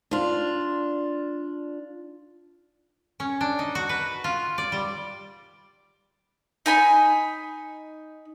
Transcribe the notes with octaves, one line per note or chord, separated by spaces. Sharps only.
D4 F4
C#4
D4
D#4
F#4
B4
F4
D5
G3
D#4 G#5 B5